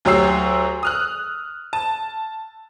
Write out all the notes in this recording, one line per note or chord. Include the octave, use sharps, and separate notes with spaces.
D2 F#3 G4 C#5 E6 C7
D#6 F6 F#6
A5